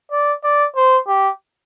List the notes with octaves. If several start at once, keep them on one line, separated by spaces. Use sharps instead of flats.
D5
D5
C5
G4